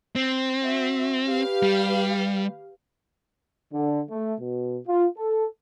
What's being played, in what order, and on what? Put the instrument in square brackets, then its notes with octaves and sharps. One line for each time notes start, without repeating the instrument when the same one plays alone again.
[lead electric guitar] C4
[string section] F#4 E5
G4 B4 F5
[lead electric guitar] G3
[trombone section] D3
A3
B2
F4
A4